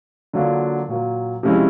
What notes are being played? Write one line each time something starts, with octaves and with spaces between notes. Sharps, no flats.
D3 F#3 A#3 D4 F4
A#2 F#3 A#3
C3 F3 G#3 C#4 E4